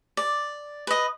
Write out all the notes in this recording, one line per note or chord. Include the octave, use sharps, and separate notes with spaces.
D5
B4 D#5